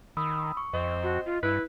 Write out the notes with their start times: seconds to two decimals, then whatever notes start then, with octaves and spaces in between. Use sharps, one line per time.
0.17 D#3 B5 D#6 E6
0.57 C#6
0.73 F2 C4 D#5
1.03 F#4
1.26 F4
1.43 G2 E4 B4